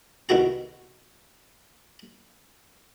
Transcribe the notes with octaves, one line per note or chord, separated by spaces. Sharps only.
C2 B2 D#3 F#4 A#5